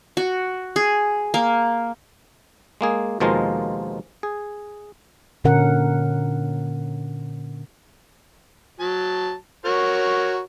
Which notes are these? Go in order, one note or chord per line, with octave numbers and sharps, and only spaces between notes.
F#4
G#4
A#3
G#3 A#3 G#4
D#2 B2 F3 G#3 F4 A#4
G#4
A#2 D3 C#4 A#4 F#5
F#3 A5
F#4 A#4 C#5